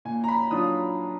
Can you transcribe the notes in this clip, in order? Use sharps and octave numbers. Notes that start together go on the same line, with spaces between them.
A#2 G#5
A#5
B5
F#3 D4 F4 D#6